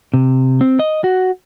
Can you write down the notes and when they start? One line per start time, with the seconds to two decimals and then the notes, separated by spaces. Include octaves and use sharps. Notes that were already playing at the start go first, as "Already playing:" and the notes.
0.14 C3
0.61 C4
0.79 D#5
1.04 F#4